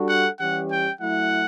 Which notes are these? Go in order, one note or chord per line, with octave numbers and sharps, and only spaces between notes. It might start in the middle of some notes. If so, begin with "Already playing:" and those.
Already playing: G3 D4 F#4 A4
F#5
E3 G3 C#4 G4 F#5
G5
F#3 A3 E4 F#5